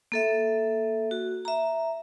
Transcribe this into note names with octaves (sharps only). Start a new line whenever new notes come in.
A#3 A4 E5
F#4
E5 A#5